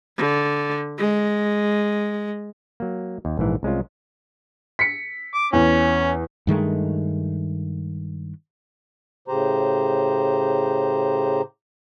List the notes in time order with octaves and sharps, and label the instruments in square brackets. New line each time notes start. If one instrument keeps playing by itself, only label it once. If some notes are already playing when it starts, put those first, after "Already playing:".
[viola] D3
G#3
[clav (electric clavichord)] F#3 A#3
D#2
A#1 G#2 E3
C2 G#3 C#4 F4
[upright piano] B6 C#7
[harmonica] D6
[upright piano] E2 [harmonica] C#4
[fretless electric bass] G2 D#3 G#3 A3
[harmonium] A2 C#3 G4 C5 A#5